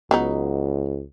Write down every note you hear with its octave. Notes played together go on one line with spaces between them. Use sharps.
C#2 F#3 B3 D#4